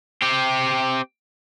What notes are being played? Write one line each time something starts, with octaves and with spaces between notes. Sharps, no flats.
C4 G4